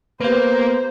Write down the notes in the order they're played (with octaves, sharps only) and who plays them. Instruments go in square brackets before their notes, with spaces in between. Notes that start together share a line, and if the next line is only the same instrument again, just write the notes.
[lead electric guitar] A#3 [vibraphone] B3 G4 [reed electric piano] B4 F5 [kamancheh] C5